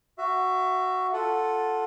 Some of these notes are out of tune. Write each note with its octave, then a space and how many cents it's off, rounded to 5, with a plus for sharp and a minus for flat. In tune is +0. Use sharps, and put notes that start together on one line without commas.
F#4 +0 E5 +25
F4 +10 A4 +0 F#5 +0